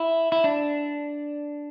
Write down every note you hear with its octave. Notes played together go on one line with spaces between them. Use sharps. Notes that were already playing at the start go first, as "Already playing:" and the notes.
Already playing: E4
E4
D4